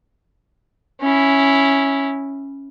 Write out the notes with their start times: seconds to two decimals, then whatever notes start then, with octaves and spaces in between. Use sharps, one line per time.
1.02 C#4 E4